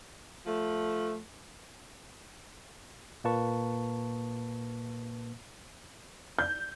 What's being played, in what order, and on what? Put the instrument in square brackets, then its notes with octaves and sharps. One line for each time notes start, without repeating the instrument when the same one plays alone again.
[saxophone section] F3 A3
[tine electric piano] A#2 A#3 B4 A5 C#6
[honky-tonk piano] G6